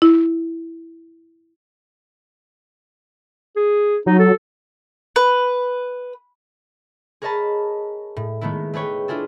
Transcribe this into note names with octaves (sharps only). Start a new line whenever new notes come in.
E4
G#4
F#3 D#4
A4
B4
G#4 A#4 C#5 D#5 A5 B5
A2
D#3 G#3 A3 B3 E4
A3 G#4 B4 C#5 G5
D4 E4 F4 G#4 A4